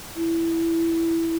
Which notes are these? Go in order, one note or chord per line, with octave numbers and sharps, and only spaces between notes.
E4